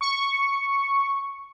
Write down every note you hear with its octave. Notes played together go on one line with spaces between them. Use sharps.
C#6